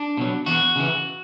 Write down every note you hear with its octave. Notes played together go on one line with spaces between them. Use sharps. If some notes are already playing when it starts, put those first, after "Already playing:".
Already playing: D4
B2 F#3
E2 F#4
C#3 E3